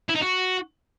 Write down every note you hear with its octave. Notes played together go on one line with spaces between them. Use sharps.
E4
D#4
F#4